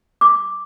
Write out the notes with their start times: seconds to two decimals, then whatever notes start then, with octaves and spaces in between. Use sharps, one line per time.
0.21 D6